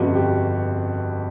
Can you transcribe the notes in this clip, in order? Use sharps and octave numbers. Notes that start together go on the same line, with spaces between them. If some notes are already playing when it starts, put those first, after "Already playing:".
Already playing: G1 F2 C#3 F#4
G4